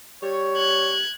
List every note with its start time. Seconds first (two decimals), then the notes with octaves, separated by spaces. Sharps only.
0.23 G3 C#5
0.56 F#6 G#6